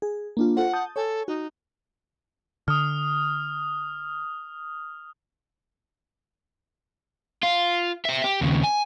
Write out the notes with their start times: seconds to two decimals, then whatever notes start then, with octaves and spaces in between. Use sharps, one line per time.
0.02 G#4
0.37 A#3 D4 F4
0.57 F4 A4 C5 F#5
0.73 A5 D#6 G6
0.96 A4 C#5 G#5
1.28 D#4 F#4
2.68 D3 D#6 F6
7.43 F4
8.05 C5 E5
8.24 G4
8.41 D#2 C#3
8.64 G#5